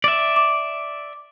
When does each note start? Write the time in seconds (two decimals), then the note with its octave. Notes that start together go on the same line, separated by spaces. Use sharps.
0.04 D5 E5
0.36 D6